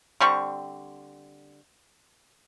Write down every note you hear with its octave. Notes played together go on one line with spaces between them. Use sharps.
D3 G3 C4 C#6